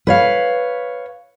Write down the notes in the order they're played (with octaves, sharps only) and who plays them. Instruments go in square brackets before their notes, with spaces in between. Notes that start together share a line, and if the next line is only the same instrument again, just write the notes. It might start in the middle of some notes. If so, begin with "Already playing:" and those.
[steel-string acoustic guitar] B4 C#5 F5